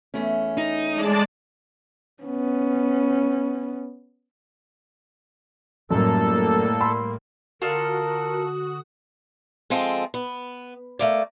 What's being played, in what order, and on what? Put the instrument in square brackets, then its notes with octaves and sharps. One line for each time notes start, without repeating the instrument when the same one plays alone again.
[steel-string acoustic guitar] E2 A3 C#4
[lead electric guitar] D#4
[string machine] G#3 D5 A5
[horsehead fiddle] B3 C#4
[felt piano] F#2 [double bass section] A2 G3 A#3 [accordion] A4
[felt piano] B5 C6 E6
[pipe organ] D3 D#6 [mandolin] F4 A4 D5 [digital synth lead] F#4 [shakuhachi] A#4
[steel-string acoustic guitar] F3 G#3 C4 A4
B3
A3 A#3 D5